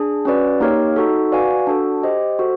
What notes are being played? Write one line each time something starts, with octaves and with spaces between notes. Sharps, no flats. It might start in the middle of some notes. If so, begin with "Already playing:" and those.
Already playing: D4 G#4
C#4 F#4 B4 D5
A#3 D#4 G4 A#4 C#5
D#4 F#4 A4
F#4 B4 D5 F5 G#5
D4 F#4 A4
G4 C5 D#5
F#4 A4 C5